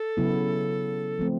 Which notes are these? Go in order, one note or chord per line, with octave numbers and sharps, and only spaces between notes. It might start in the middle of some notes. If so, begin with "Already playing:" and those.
Already playing: A4
C#3 F#3 B3 E4
F3 A3 C4